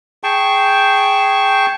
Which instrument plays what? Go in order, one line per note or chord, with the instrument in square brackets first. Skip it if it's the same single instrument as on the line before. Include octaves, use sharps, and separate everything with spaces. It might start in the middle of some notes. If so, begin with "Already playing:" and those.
[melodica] G#4 G5 A5 C#6